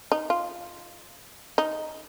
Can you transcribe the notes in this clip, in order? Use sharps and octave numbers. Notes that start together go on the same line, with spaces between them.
D#4
F4
D#4